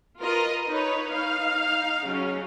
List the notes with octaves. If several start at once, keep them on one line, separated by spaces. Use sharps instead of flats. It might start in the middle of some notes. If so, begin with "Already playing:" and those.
F4 A#4 B4 D#5
D#4 B4 C#5
D#4 F5
C#3 F#3 C#4